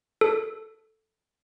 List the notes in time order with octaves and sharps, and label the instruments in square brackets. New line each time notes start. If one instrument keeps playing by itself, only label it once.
[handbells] A4